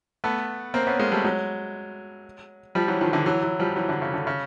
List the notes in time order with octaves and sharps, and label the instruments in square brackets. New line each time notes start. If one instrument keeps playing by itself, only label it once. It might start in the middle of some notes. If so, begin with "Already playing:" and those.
[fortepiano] A3 B3
A#3 C4
B3 C#4
G#3 A#3
G3 A3
F#3 G#3
F3 G3
E3 F#3
D#3 F3
D3 E3
E3 F#3
E3 F#3
F3 G3
E3 F#3
D3
C#3
D3
C#3